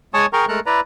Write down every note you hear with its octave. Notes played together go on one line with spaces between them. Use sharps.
G#3 C#5 G#5 A5 C#6 D#6
G#4 A#4 G5 A#5 C#6
G#3 A3 A4 A#4 A#5 F#6
E4 B4 D5 A#5